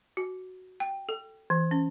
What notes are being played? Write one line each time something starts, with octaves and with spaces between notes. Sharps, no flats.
F#4
G5
A4
E3
C#4